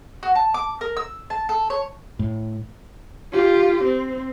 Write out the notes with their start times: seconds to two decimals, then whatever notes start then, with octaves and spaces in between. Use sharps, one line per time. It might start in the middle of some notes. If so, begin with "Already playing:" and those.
0.23 F#4
0.35 A5
0.54 D6
0.81 A#4
0.97 E6
1.30 A5
1.49 A4
1.70 C#5
2.19 A2
3.32 F4 G4
3.84 C4